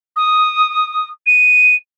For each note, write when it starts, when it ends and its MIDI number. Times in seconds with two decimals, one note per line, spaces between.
0.16 1.08 87
1.26 1.75 99